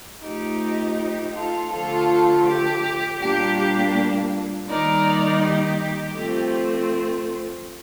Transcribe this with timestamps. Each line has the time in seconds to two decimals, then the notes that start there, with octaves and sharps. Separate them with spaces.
0.22 F3 A3 D#4 G4
0.97 G4
1.35 F4 A4
1.71 D3 F3 A3 F4 A4
2.46 G4
3.20 A#2 G3 A#3 D4 G4
3.57 G4
4.68 D#3 G3 A#3 D#4 A#4 D5
5.43 G4
6.17 F3 A3 C4